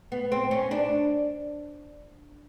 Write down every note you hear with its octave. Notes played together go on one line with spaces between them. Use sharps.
B3
C4
C#4
D4